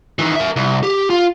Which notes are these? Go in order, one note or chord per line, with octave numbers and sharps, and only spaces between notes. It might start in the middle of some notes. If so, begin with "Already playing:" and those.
D#3 E3
A#4 E5
C2
G4
F4